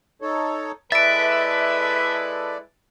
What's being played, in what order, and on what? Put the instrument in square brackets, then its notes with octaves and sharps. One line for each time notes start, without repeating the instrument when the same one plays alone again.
[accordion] D#4 A4 C#5
[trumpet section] G#3 E4 B4 [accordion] A4 D5 [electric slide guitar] E5 [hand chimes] A6 D7